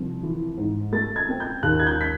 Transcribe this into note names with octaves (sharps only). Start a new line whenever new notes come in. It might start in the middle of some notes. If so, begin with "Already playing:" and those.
Already playing: C2 F3
E3
G#2
A3 A6
G#6
C4
G6
D#2 F#6
G#6
G6
B6